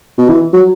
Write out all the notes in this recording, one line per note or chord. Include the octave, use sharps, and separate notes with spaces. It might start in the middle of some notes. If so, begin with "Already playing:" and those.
B2
E3
F#3